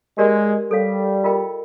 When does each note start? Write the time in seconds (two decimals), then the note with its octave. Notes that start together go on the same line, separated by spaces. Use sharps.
0.18 G#3 G4 A#4 D5
0.71 G3 A4 C#5 F5
1.24 F4 A#4 D#5 G5 B5